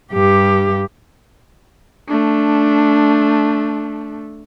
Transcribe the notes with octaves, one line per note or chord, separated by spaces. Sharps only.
G2 G4
A3 D4